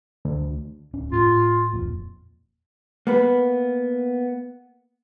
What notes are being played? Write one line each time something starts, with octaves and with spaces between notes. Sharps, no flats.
D2
D1 C#4
A2 F4
D#1 F2 A#2
A#3 B3 B4